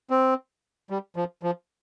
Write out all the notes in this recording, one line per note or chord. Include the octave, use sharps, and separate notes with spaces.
C4
G3
F3
F3